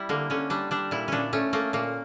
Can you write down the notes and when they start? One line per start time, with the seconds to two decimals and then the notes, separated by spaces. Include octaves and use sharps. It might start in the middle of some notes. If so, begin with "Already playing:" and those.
Already playing: G3 E4
0.09 D3 A#3
0.30 D3 C#4
0.50 G3 D4
0.71 G3 D4
0.91 A#2 E4
1.08 A#2 C#4 D4
1.33 A3 C#4
1.53 A3 A#3
1.73 A#2 A#3